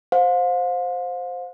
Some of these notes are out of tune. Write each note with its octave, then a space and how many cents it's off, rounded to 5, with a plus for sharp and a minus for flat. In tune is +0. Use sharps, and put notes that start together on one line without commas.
C5 +0 F5 +40